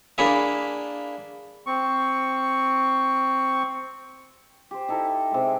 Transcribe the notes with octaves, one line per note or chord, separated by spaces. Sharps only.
A#3 D4 E4 G#4 E5
C4 C#6
G4 C5
D#4 E4 A4 C5
C3 G#3